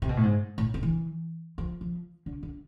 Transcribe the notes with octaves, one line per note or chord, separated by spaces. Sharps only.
C3
B2
A2
G#2
A2
C3
E3
F3
F3
D3
D3